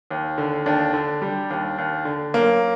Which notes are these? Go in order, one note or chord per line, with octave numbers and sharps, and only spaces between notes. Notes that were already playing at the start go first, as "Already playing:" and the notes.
D#2
D3
D#2 D4
D3
G3
D#2
D#2
D3
F#2 A#3